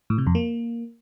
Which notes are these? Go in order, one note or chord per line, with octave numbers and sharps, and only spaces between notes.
A2
C3
F2
A#3